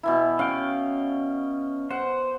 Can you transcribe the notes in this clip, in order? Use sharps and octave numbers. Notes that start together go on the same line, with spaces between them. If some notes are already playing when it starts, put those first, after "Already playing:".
B2 E3 E4
C#4 F5 G5
C5 F#5